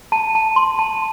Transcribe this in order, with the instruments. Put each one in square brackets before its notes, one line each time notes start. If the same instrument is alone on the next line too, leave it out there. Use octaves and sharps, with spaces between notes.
[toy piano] A5
A5
C6
A5